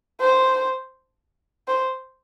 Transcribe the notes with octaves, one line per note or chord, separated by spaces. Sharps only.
C5
C5